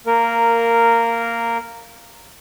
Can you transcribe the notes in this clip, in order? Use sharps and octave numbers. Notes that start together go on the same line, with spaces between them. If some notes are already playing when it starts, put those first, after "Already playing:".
A#3 A#4